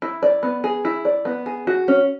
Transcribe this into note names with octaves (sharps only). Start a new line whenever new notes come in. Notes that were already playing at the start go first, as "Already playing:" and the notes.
E4
D5
B3
G#4
E4
D5
B3
G#4
F#4
C#4